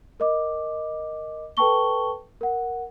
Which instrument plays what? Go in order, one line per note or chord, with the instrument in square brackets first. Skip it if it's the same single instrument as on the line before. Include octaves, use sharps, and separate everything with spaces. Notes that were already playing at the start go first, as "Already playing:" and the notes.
[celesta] A#4 D#5 D6
A4 B4 G5 A5 C#6 G7
A#4 F#5